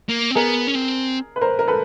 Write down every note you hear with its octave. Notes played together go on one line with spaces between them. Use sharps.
A#3
C4
B3 G#4 A#4
C#4
C4
B4
A#4 C5
A#4
A4 B4